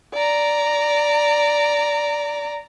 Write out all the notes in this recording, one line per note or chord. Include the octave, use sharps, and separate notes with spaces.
D5 A#5